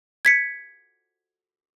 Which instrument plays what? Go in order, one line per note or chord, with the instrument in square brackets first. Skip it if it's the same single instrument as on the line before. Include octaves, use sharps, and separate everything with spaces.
[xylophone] G#6 B6 C#7